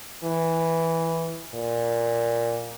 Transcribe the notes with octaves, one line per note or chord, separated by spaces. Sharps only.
E3
A#2